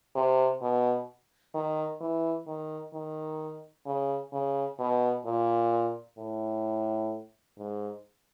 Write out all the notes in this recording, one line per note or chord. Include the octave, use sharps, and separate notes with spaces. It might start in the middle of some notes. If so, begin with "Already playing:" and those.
C3
B2
D#3
E3
D#3
D#3
C#3
C#3
B2
A#2
A2
G#2